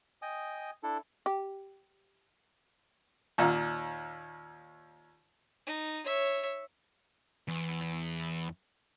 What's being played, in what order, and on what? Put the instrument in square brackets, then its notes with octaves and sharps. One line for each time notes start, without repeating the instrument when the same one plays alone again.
[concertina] D#5 G5 G#5 D#6
D4 E4 A4
[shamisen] G4
[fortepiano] D#2 A#2
[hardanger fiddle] D#4
C#5 E5
[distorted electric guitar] E2